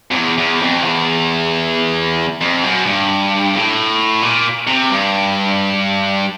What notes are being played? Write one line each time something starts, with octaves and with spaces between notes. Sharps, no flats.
F2
E2
E2
F2
E2
F2
F#2
G2
A2
A#2
C3
G2